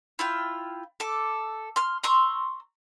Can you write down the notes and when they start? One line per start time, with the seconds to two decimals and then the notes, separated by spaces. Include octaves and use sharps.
0.19 E4 F4 G5
1.00 A4 D6
1.76 C6 F6
2.03 A#5 C6 C#6 E6